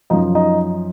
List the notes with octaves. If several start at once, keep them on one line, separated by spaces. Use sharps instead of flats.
F#2 F3 D#4 D#5
D#4 D#5